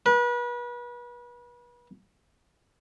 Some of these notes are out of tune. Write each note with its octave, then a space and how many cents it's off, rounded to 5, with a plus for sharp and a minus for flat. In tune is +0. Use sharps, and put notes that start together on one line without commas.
B4 -35